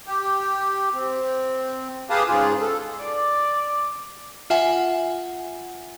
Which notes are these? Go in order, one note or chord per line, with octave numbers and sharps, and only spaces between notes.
G4
C4
G4 G#4 B4 F5 A5 D#6
G#2 C#3 F4 G#4
A4
D5
F4 E5 F#5 G#5